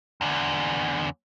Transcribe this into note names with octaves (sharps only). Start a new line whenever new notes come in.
E2 D3